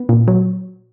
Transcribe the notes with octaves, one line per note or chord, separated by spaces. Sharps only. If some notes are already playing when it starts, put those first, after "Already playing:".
Already playing: B3
A#2
F#3